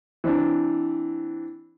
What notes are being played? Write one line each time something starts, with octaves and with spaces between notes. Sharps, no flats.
E3 C4 D4